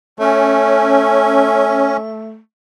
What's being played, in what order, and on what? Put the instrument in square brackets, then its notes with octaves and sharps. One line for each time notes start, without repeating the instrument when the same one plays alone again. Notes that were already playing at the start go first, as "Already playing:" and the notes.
[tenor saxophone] A3 [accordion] C#4